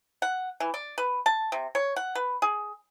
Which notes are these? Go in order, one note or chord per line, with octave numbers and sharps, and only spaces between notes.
F#5
E3
D5
B4
A5
C3
C#5
F#5
B4
G#4